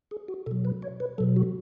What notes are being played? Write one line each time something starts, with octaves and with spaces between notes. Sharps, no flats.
G#4
F#4
B2 F#3 A4
B4
C#5
B4
B2 F#3 A4
F#4